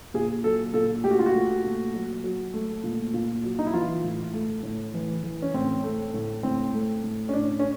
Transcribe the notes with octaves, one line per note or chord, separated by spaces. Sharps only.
A#2 G#4
F#3 A4
A#2 A4
A3 G4
F#4
F4
F#4
A3
A#2
F#3
F#3
A3
A#2
A#2
F#3
D#4
E4
E3 F4
A2
A3
A2
E3
E3
C#4
A2 C4
A3
A2
A2 C4
A3
A2
C#4
A2 D4
C#4